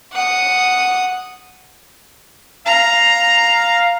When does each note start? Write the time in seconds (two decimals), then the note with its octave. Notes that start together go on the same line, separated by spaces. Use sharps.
0.12 F#5 D#6
2.66 F5 A#5